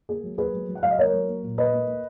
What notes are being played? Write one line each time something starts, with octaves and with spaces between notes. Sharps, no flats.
A#3 G#4
F#3
A#3 G#4 B4
F#3
F#3
F#5
F#3 F5
D#5
A#3 A#4 C#5
F#3
A#3
A#2
A#3 B4 D#5
A#3
A#3